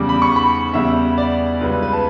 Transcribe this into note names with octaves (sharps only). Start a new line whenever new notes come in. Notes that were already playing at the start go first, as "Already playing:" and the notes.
Already playing: E2 C#3 G3 D6
B5
C#6
B5
E2 C#3 G3 E5
D5
C#2 C#3 G3 B4
B4
B4
A5